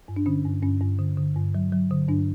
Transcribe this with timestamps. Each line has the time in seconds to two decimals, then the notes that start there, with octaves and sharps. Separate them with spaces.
0.08 G2
0.16 D4
0.26 D3 C#4
0.45 G2
0.63 G2 C#4
0.81 G2
0.99 D3
1.17 D3
1.36 G2
1.54 F#3
1.72 F#3
1.91 D3
2.08 G2 D4